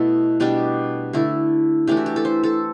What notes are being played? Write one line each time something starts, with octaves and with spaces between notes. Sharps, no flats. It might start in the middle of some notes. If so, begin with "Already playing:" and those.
Already playing: B2 A3 E4 A4
B2 G3 D4 G4
D3 A3 E4
E3 A3 D4 G4
F#4
G4
A4
C5
A4